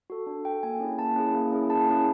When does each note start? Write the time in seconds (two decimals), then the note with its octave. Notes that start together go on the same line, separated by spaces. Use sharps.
0.10 F#4 A4
0.27 D4
0.45 F#4 A4 G5
0.63 A#3 G#5
0.80 C#4 E4 G#4
0.99 A#3 A5
1.16 C#4 E4 G#4
1.34 A#3
1.52 C#4 E4 G#4
1.70 A#3 A5
1.88 C#4 E4 G#4